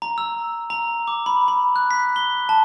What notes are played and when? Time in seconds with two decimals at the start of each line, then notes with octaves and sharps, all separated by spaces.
0.02 A#5
0.18 E6
0.70 A#5
1.08 D6
1.26 B5
1.48 B5
1.76 F#6
1.91 B6
2.16 G7
2.49 A5